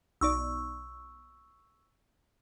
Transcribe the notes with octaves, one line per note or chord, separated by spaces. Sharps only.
B1 D#4 D5 C#6 E6